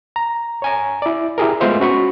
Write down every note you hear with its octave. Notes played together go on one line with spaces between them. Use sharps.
A#5
C#5 G#5 A#5
E4 D5
E4 G4 G#4 A#4
G#3 A3 B3 F4 C5 E5
C#4 F#4 B5 C#6